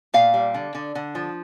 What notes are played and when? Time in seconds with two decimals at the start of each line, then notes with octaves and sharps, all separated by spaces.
0.14 A#2 F5
0.34 G3
0.54 D3
0.75 D3
0.95 D3
1.15 F3